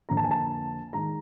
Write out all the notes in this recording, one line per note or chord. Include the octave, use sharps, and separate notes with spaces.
F2 D3 F3 A#3 A#5
A5
G#5
A5
D#3 G#3 A#5